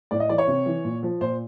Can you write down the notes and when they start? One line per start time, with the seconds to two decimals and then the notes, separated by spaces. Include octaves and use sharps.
0.11 A2 D5
0.20 D#5
0.29 E3 D5
0.38 C#5
0.48 C3
0.66 E3
0.84 A#2
1.03 F3
1.21 A#2 C5